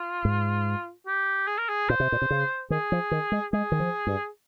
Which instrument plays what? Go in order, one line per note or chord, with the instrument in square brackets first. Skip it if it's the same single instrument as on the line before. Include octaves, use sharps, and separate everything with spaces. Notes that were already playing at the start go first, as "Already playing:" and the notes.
Already playing: [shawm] F4
[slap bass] G#2
[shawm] G4
G#4
A#4
G#4
[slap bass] A#2 [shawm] C5
[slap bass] C3
A#2
C3
C#3
[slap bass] D#3 [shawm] G#4
[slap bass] F3
D#3
G#3
[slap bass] G#3 [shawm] G#4
[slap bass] D#3
F3
G2